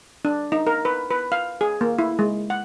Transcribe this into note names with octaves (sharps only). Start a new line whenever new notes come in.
D4
D#4
A#4
B4
B4
F5
G#4
A#3
E4
G#3
F#5